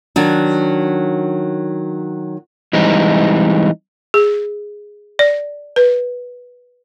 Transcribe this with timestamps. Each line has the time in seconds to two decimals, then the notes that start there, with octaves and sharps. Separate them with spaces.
0.16 D#3 F#3 D4
2.73 E3 G3 G#3 C4 D#4
4.14 G#4
5.19 D5
5.76 B4